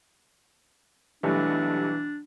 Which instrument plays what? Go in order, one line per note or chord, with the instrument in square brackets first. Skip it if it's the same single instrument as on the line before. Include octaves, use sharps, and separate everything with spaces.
[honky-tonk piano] B1 G3 A3 [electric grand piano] E3 [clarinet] D4